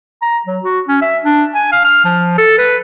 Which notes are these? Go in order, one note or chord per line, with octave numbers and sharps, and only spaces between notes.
A#5
F#3
F#4
C#4
E5
D4
G#5
F5
F6
F3
A4
B4